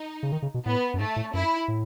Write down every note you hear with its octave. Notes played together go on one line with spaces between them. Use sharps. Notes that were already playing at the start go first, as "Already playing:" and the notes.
Already playing: D#4
C#3
D#3
C#3
B2
A2 B3
F#2
G#2 A3
A2
F#2 E4
A2